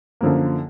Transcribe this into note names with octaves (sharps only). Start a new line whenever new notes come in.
F#2 D3 F3 A#3